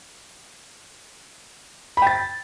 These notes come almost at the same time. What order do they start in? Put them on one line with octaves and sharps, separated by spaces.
B5 G5 A6